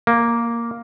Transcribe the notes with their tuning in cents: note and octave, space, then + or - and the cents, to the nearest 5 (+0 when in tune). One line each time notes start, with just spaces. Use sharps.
A#3 +0